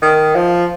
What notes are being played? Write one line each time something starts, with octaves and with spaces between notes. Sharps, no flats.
D#3
F3